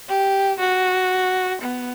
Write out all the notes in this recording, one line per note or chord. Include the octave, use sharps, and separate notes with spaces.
G4
F#4
B3